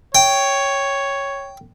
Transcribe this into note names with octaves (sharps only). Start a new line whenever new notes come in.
C#5 G5